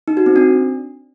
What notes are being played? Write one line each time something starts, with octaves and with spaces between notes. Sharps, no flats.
D#4
F#4
C4
D4